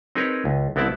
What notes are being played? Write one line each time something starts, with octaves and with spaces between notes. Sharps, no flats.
C4 D#4 G#4 A#4 B4 C#5
C#2
C2 B3 C4 E4 D5 A5